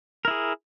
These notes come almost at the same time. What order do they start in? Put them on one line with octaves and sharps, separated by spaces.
A#4 E4 G#4